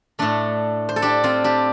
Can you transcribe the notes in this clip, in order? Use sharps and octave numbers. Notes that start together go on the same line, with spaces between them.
A2 A3 D4
C5
A4
D4 G4
C4 F4
D4 G4